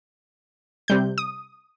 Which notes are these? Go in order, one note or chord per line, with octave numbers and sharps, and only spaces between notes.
C3 G3 G6
D#6